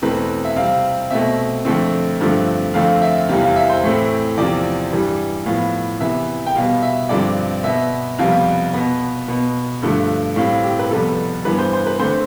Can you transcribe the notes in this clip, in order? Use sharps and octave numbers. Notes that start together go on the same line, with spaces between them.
E2 B2 A3 C4 B4
E5
C3 G3 C4 F5
B2 A3 C4 E5
F2 D3 A3 C4
G2 D3 F3 A3 C4
F2 D3 A3 C4 F5
E5
E2 C3 E3 G3 C4 F5
F5
E5
C5
A2 E3 A3 C4
E2 C3 F3 C4 D5
G2 E3 G3
A2 F3 B3 F5
C3 E3 B3 E5
G5
B2 G3 B3 F5
E5
G2 D3 F3 C4 D5
B2 B3 E5
F2 C3 G3 B3 F5
B2 B3
B2 B3
G2 D3 F3 A3
A2 G3 C4 F5
G4
B4
F2 C3 G3 B3 A4
G2 E3 B3 B4
C5
C5
B4
D3 A3 C4 C5